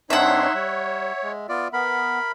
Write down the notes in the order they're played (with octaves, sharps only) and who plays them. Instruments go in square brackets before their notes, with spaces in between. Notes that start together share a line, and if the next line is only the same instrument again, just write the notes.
[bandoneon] G2 C4 D4 [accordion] D#4 C#5 C6 [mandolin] E5 F#5
[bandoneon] G3 [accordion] C#5
[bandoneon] G#3
B3 F4 D5
[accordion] B3 [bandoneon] A#4 B5